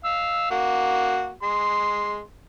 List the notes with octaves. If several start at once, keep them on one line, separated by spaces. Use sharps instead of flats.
F5 E6
A#3 F#4
G#3 C6